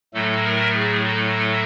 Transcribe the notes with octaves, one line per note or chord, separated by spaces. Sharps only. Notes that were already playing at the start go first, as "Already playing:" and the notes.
A2 F#3 A3 A4
A#4
G#4
A4